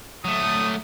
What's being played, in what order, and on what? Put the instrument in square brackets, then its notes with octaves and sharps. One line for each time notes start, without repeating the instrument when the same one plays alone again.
[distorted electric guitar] F#3 A3 [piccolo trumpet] D#6